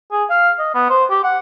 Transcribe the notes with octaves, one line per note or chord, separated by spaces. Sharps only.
G#4
F5
D#5
B3
C5
G4
F#5